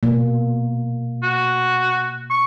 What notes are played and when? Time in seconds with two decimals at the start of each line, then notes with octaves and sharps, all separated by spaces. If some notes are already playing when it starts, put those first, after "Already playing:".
0.03 B2 A#3
1.23 F#4
2.30 C#6